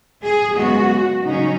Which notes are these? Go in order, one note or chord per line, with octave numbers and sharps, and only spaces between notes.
G#4
F#2 C#3 G#3 B3 F#4
C#3 F#3 C#4 D#4